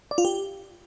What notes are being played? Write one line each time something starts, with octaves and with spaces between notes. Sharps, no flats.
D5
F4
G4